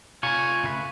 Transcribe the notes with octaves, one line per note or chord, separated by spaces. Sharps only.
F4 G#5 C#6
C#3 A3 B4